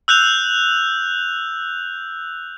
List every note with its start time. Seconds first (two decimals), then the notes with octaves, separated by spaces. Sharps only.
0.08 E6 F#6 G6 F7